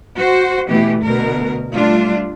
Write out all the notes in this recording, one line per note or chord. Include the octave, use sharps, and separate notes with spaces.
F#4 C5
B2 E3 A3 G4
D2 B2 A#4
G3 A3 D4 F4